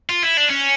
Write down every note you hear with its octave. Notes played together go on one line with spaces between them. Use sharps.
F4
E4
D4
C#4